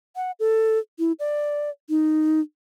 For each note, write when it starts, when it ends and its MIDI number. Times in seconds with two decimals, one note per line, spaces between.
0.16 0.31 78
0.40 0.79 69
0.99 1.12 64
1.19 1.70 74
1.89 2.40 63